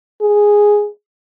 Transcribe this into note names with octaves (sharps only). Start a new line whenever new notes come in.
G#4